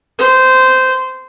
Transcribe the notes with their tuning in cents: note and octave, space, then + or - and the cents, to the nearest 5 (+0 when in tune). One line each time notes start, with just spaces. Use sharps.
C5 -15